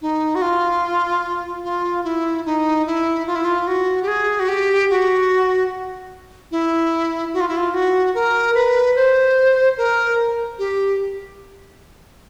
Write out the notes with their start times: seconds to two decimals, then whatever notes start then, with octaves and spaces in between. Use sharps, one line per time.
0.02 D#4
0.35 F#4
0.42 F4
1.64 F4
2.04 E4
2.46 D#4
2.86 E4
3.27 F4
3.35 E4
3.45 F4
3.67 F#4
4.03 G4
4.08 G#4
4.40 F#4
4.48 G4
4.90 F#4
6.51 E4
7.34 F#4
7.41 F4
7.48 E4
7.57 F4
7.74 F#4
8.15 A#4
8.55 B4
8.96 C5
9.77 A#4
10.59 G4